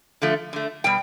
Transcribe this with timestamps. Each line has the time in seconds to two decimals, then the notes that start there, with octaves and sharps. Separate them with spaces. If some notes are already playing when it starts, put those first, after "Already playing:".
0.22 D3 F3 A3
0.53 D3 A3
0.84 B2 G3 G5